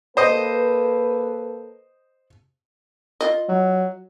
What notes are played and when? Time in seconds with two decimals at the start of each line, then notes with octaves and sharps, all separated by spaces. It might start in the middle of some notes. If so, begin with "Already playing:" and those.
0.17 A#3 A4 B4 C5 D#5
3.21 F4 D#5
3.49 F#3